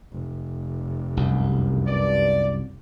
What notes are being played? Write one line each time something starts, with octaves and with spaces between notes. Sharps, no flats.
F1
C2 F#2
G2 D5